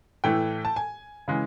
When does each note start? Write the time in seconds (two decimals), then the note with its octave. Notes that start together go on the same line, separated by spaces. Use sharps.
0.24 A2 E3 A3 G5
0.65 A5
0.76 G#5
1.28 C#3 E3 G#3